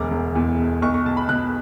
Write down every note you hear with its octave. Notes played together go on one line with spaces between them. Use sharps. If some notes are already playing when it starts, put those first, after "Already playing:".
Already playing: E1 D2 D6
E1
E2
B2
B1 C#6
C#6
B2 A5
B5
B2 F#6